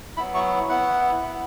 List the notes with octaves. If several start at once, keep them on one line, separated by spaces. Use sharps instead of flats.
F#3 B3 E4 B5
C#6
B3 E4 F#5
B3 E4